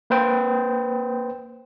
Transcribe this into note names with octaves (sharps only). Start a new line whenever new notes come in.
A#3 B4 C5 G5